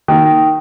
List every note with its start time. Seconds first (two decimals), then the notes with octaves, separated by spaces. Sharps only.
0.08 D#3